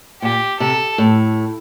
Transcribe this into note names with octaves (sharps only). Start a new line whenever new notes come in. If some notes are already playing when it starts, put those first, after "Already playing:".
A#2 G4
C3 A4
A2